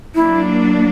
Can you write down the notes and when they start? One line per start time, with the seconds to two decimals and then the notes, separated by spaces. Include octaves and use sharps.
0.15 F#3 A#3 D4 E4